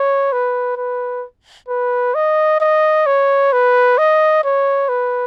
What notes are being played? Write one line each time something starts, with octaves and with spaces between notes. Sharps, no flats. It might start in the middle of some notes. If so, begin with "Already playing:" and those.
Already playing: C#5
B4
B4
B4
D#5
D#5
C#5
B4
D#5
C#5
B4